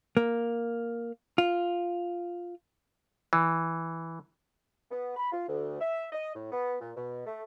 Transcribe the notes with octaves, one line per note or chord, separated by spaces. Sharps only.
A#3
F4
E3
B3
B5
F4
D2
E5
D#5
A2
B3
A#2
B2
A3